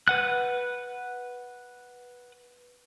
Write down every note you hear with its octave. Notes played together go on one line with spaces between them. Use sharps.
B4 F#5 F#6